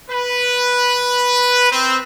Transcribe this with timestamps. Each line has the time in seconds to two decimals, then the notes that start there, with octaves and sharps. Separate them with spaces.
0.10 B4
1.72 C4